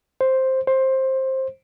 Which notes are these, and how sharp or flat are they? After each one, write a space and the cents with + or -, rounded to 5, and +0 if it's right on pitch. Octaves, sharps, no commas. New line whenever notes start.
C5 +5
C5 +15